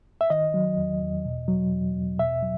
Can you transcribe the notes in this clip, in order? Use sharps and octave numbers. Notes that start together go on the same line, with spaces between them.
E5
D#3 D#5
F#3
E2
E2
B2
F#3
E2
E2
B2 E5
F#3